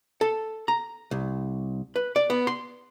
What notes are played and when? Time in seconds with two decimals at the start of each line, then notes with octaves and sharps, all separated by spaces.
0.21 A4
0.68 A#5
1.11 C2
1.96 B4
2.16 D5
2.30 B3
2.47 C6